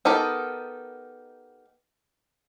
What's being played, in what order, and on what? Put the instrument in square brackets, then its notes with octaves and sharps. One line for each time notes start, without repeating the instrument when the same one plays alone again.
[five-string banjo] B3 D#4 G4 A4 A#4